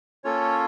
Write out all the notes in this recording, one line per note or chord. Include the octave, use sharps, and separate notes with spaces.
A#3 C#4 F4 A4 C#5